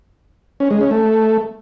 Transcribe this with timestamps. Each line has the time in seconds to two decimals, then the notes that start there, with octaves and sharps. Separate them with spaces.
0.60 C#4
0.70 G#3
0.81 C#4
0.91 A3